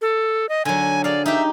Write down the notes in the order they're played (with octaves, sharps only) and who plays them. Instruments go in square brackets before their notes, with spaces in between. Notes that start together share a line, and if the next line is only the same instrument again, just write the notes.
[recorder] A4
D#5
[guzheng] D3 F#3 [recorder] G#5
[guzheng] G#4 F5 [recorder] D5
[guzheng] D#4 G4 [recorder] E5